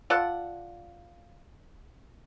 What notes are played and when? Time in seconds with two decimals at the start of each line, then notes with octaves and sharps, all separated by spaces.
0.10 F4 A4 D5 F#5